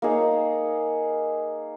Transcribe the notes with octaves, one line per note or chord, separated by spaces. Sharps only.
A#3 D#4 G#4 C#5